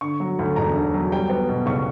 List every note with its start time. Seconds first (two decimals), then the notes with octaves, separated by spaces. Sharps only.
0.01 D3 C#6
0.20 F#3
0.39 D2
0.56 E1 A#5
0.76 D3
0.94 F#3
1.12 G3 G5
1.29 B3
1.49 B2
1.66 C#2 C#6